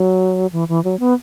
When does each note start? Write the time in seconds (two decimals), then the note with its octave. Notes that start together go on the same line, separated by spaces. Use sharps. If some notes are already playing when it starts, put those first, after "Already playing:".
Already playing: F#3
0.52 E3
0.68 E3
0.84 F#3
1.00 B3